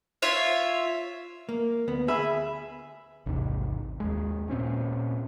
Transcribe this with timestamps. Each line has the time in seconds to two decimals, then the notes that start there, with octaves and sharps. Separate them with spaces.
0.22 F4 C#5 E5
1.49 A#3
1.88 D2 B3
2.08 G#4 E5 B5
3.26 A1 D#2 G#2 C3
4.00 D#2 G#3
4.49 A#2 C4 C#4